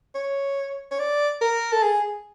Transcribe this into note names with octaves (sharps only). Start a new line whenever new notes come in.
C#5
C#5
D5
A#4
A4
G#4